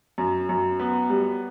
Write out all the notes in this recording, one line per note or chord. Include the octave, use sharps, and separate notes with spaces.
F#2
F#2
B3
G3